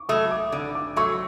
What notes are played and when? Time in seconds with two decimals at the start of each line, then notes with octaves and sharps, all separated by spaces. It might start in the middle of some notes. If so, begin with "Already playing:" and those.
Already playing: C#6 D6
0.09 F#3 A3 D#6
0.31 D6
0.52 D3 D6
0.75 D6
0.96 F#3 A3 C#6